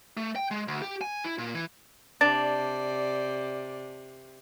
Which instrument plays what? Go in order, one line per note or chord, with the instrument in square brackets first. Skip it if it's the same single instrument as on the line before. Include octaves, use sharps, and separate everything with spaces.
[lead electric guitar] A3
G5
G#3
D2
G4
G#5
E4
A#2
E3
[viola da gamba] C3 [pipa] D4 [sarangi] D5 [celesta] A6